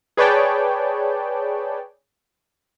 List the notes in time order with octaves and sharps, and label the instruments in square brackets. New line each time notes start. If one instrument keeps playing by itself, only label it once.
[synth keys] G#4 B4 C#5 D5 G5 A5